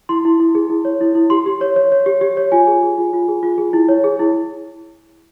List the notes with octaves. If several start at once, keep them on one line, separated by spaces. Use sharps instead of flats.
E4 C6
E4
E4
G#4
E4
C#5
E4
E4
G4 C6
G4
C#5
C#5
C#5
G4
G4
C#5
F4 G#5
G#4
G#4
F4
F4
G#4
F4
G#4
E4
C#5
G#4
E4